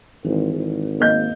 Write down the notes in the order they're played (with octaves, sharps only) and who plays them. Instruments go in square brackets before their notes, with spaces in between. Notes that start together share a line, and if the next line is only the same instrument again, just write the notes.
[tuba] G#1 [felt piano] E3
[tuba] G#1
[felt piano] A#3 D#5 G6